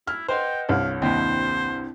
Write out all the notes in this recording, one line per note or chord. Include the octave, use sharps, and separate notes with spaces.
E4 F6
B4 C5 D#5 F#5 G5
C2 G2 C#5 F5
D#2 C4 D4 E4 C5